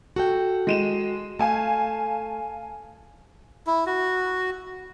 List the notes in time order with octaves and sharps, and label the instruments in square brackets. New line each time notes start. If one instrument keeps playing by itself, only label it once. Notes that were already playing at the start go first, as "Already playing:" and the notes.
[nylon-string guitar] F#4 A4 G5
[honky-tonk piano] G#3 D#7 E7
[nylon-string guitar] A3 [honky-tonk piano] F5 G#5 A5
[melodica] E4
F#4